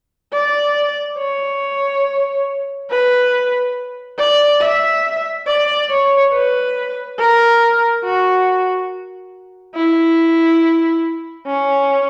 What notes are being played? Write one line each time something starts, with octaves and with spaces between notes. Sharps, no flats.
D5
C#5
B4
D5
E5
D5
C#5
B4
A#4
F#4
E4
C#4